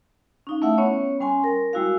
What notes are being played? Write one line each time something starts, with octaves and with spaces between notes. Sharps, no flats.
C#4 D#4 F5
A3 E4 E5 F#5
B3 C#4 C#5
G3 C#4 G#5 C6
A#4
G3 G#3 E4 F#4 F5